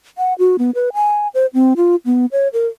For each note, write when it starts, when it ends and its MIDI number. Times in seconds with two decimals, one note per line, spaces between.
0.18 0.34 78
0.39 0.56 66
0.59 0.71 59
0.75 0.89 71
0.94 1.28 80
1.34 1.46 72
1.54 1.73 60
1.77 1.96 65
2.05 2.26 59
2.32 2.48 73
2.53 2.67 70